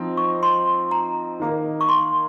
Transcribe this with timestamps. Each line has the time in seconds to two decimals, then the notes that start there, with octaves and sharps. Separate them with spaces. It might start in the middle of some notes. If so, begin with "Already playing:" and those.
Already playing: F3 C4 D#4
0.17 C#6
0.43 C6
0.91 A#5
1.40 D#3 A#3 D#4
1.81 C#6
1.89 C6